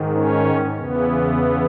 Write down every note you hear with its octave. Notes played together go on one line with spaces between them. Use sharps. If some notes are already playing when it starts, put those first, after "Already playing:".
Already playing: G#2 D#3
C#4
E2 C#3 E3 B3